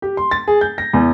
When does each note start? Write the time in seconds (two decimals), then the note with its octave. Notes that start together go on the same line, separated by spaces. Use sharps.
0.02 G4
0.17 C6
0.31 A6
0.48 G#4
0.61 G6
0.78 A#6
0.93 E2